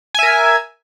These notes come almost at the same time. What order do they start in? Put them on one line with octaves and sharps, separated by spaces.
G#5 E5 A#4